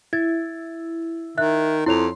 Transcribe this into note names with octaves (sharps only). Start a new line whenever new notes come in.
E4 G#6 A6
D#3 E5 F#6
F2 E4 C#5 C6 F7